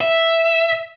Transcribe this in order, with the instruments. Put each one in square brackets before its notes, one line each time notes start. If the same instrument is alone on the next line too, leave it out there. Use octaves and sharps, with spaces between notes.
[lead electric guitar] E5